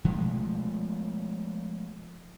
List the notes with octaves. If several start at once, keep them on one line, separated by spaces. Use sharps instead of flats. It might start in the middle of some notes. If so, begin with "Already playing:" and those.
B2 F3 G#3 A3